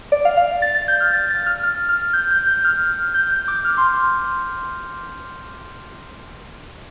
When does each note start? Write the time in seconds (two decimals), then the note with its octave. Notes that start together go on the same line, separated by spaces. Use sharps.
0.12 D5
0.25 F5
0.37 F5
0.62 A6
0.75 A6
0.88 G6
1.00 F6
1.13 A6
1.30 A6
1.46 F6
1.63 F6
1.89 F6
2.13 G6
2.31 G6
2.47 G6
2.65 F6
3.14 G6
3.31 G6
3.48 D6
3.65 F6
3.78 C6